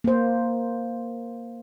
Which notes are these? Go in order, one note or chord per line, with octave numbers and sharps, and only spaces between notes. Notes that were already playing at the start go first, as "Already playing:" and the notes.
A#3 C5